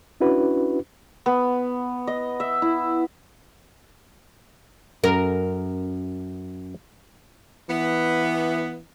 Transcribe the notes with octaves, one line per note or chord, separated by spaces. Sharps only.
C#4 D4 E4 F#4 B4
B3
D#5
E5
E4
F#2 A#4
E3 B3